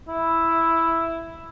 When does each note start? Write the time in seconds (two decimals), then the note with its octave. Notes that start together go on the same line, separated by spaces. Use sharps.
0.08 E4